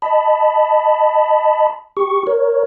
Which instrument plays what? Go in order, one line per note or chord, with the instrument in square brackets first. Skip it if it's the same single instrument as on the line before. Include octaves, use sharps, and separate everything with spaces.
[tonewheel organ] D#5 A5 B5
G4 C#6
A#4 C#5